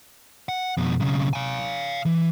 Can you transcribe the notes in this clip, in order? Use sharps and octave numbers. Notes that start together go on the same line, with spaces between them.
F#5
F2 B2
B1 C#3
F5 G#5
E3